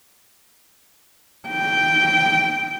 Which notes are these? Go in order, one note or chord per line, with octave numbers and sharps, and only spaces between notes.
G5